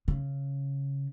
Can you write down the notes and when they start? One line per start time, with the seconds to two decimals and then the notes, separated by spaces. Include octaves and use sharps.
0.08 C#3